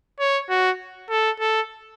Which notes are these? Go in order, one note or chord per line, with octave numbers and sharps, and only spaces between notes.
C#5
F#4
A4
A4